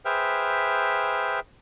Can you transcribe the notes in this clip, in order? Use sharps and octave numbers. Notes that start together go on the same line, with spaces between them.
G#4 B4 C5 E5 G5 F6